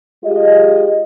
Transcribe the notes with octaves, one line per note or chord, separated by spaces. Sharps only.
G#3 F4 G4 G#4 D#5